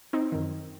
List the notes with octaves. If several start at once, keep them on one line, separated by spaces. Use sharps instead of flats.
C4 D#4
F#2 D#3